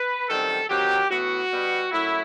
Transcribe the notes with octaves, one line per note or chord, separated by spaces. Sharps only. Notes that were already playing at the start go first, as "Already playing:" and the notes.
Already playing: B4
F#2 D#3 G3 C4 A4
D#3 F#3 C4 G4
A2 E3 B3 F#4
B2 G3 B3
F#2 F#3 A3 E4